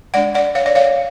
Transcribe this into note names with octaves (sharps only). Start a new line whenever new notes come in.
G#3 D4 D5 F#5
D5 F#5
C#5 F5
D5
C#5 F5